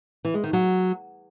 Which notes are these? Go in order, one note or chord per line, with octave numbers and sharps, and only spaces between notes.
E3
G#3
D#3
F#3